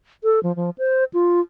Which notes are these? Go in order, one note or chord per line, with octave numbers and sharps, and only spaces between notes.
A4
F3
F3
C5
F4